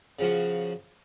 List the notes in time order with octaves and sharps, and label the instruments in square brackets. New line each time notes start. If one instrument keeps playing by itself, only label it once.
[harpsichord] C#3 F3 F#4